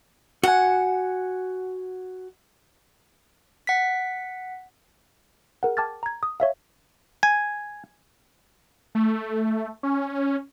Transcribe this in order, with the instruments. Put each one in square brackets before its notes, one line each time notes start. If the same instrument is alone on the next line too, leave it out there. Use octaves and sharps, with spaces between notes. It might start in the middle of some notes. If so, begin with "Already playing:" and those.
[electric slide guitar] F#4 G#5 [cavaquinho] F#5
[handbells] F#5 B6
G#4 A#4 F#5
G5 A5 D6 F6 G#6 A6
A#5 G#6
D#6
C#5 E5 F5
[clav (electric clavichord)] G#5
[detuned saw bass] A3
C#4